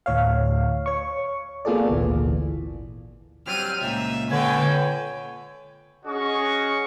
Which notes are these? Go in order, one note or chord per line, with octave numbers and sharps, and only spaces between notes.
D2 A2 C#5 F5
C#5 C#6
A#3 B3 F4 G#4 A4 D5
G#1 D2 A#2 E3
F#3 G3 C4 F6 D#7
C#2 A#2 E5
D3 B4 C#5 G5 G#5
C#4 F#4 G#4 D#5 C#6